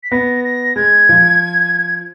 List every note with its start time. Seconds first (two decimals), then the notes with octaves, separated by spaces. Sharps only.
0.04 B6
0.11 B3 A#6
0.44 A#6
0.76 G#3 G#6
1.09 F3